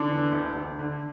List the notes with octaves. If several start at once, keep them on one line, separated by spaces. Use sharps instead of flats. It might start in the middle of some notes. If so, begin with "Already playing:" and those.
Already playing: D3 D4
E2
D2
D2
D3